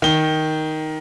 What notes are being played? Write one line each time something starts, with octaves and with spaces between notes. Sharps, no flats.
D#3 G7